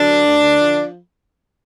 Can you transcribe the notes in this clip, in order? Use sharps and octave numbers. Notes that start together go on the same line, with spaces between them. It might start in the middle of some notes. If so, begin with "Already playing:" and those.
Already playing: D3 F#3 D4
D2
D2
D3
F3